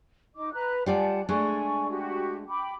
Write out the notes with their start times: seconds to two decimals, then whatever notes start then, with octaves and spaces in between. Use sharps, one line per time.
0.36 D#4 D#5 D6
0.53 B4 A#5 F#6
0.86 G3 F4 D5 F#5 G#5 A5
1.29 G#3 A3 D4 D5 G#5 C#6
1.89 F#4 G4
2.48 G5 B5 D6